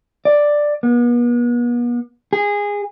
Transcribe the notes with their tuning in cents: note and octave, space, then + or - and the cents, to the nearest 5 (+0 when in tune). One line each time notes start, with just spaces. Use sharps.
D5 +5
B3 -40
G#4 -20